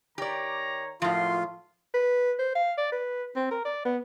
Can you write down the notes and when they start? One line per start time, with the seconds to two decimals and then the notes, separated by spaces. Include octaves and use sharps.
0.18 D#3 G4 C#5 D5 A#5
1.02 F#2 A2 F3 F4 C6
1.94 B4
2.39 C5
2.55 F5
2.78 D5
2.92 B4
3.36 C4
3.51 A#4
3.65 D5
3.85 B3